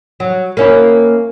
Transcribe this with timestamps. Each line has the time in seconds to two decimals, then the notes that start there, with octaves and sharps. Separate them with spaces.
0.20 F#3
0.57 A#3 C#4 E4